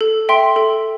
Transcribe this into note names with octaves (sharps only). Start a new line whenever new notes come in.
A4
E5 G5 C6
A4